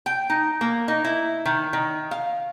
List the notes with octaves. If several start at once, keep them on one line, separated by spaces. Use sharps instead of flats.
G5
D#4
A#3
D#4
E4
D#3
D#3
F5